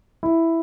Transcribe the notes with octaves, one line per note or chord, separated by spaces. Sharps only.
E4